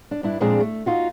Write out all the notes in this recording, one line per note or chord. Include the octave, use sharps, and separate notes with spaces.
D4
G2 D4 E4
F2 A#2 G#3 C4 D4 G#4
A3
D#4 F4 F#4